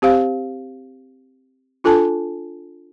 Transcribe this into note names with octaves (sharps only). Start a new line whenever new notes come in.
C4 G4 C5 F5
D4 F4 A4 G#5 A5